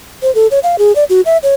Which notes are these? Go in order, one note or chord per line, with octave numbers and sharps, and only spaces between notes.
C5
A4
C#5
F5
G#4
D5
F#4
E5
C#5